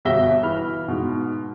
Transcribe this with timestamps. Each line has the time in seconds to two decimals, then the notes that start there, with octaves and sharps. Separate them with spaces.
0.05 G1 B2 G4 E5 A#6 G7
0.43 E3 B5 F6
0.88 G#2 B2